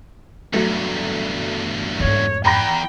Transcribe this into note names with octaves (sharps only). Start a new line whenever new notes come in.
E2 G2 F#3 A3
F2 G#2 C#5
E2 G5 A#5 B5 A#6